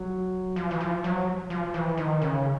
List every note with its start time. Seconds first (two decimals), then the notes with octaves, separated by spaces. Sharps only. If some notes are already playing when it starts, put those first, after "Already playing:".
Already playing: F#3
0.56 F3
0.71 E3
0.81 F3
1.04 F#3
1.50 F3
1.74 E3
1.98 D#3
2.21 C#3